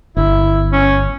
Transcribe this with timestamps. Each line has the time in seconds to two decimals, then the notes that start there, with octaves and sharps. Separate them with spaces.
0.17 G1 E4
0.73 C#4